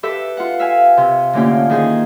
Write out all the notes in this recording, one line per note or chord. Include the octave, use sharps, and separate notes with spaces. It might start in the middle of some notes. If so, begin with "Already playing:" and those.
G4 A4 B4 E5
F4 F#5
E5 F5 G#5
C3
A2 D3 A#3 C#4 F4 G4
D#3 D#4 G#4 C5